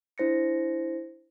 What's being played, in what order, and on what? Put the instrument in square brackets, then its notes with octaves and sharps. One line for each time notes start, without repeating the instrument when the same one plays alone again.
[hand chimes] D4 E4 C5 A#6 C#7